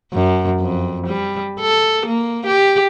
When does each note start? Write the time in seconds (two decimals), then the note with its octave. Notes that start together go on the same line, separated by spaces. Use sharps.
0.13 F#2
0.60 F2
1.07 G3
1.61 A4
2.06 A#3
2.46 G4